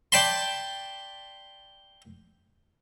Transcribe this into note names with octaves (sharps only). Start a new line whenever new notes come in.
D5 G5 A5 B5 C6